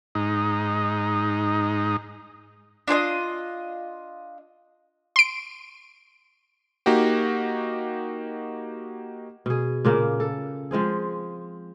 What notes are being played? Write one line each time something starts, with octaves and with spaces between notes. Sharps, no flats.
G#2 D#4
D4 F4 C5 D#5
C6 D7
A#3 D#4 F#4 G4
B2 G#4
A#2 C#3 A#3
A4
F3 G#3 C4 G#4